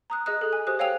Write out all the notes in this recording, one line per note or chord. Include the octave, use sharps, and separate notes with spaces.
A#5 D#6 F#6
G#4 D#5 D#6 F#6
G#4 A4
G#5
G4 C5 D#6 F#6
C#5 F5 G5 G#5 E6 F7